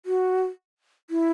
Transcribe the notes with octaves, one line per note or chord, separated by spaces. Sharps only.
F#4
E4